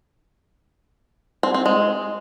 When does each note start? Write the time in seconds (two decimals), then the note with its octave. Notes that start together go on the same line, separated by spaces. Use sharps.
1.43 C4
1.54 C4
1.66 G#3